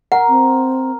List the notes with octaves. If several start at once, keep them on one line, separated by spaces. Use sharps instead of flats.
A#4 F#5
C4